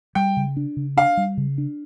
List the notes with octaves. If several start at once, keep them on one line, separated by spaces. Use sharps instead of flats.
G3 G5
C#3
D4
C#3
D4 F5
G3
C#3
D4